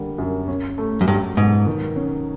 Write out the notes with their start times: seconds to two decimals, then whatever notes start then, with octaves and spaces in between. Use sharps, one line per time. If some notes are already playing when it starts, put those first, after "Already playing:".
Already playing: D3 G3 A#3
0.18 F#2
0.48 C#4
0.78 A3
1.01 F#2
1.08 G2 F#3
1.37 G#2 B2
1.66 D#3
1.96 C#4